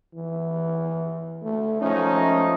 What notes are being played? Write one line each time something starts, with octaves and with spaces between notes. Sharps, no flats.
E3
A3
F3 A3 C#4 D#4